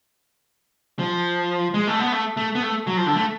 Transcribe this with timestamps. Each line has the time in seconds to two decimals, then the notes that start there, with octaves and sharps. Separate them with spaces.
0.99 F3
1.74 G#3
1.87 A3
1.99 B3
2.12 A3
2.37 A3
2.55 B3
2.63 A3
2.87 F#3
2.97 F3
3.06 D3
3.16 A3